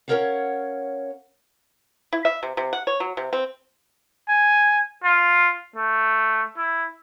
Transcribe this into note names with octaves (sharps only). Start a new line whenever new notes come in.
C#4 D#4 A#4 C#5 F5 F#5
E4
E5
C3
C3
F#5
C#5
F#3
C3
C4
G#5
F4
A3
E4